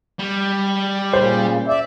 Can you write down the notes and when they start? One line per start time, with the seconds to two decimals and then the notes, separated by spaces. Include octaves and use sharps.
0.19 G3
1.13 A#2 C#3 C5
1.68 D5 E5